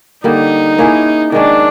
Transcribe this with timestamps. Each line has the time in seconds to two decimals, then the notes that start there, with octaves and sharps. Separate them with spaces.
0.24 D3 G3 A#3 D#4
0.78 A#3 C#4 E4 G#4
1.32 D#3 G#3 C#4 D4